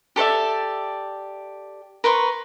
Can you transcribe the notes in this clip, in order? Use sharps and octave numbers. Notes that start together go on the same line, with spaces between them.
G4 A4 D5 E5
A#4 B4 C6 C#6